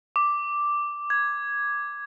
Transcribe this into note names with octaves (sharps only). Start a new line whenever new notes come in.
D6
G#6